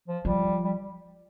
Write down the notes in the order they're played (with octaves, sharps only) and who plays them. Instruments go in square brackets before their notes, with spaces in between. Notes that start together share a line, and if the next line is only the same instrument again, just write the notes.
[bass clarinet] F3
[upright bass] F3 [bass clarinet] G3
[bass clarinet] G3